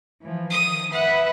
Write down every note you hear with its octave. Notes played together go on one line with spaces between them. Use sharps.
E3 F3
D#3 D#6
B4 E5 F#5